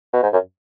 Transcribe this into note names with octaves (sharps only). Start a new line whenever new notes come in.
B2
G#2
F#2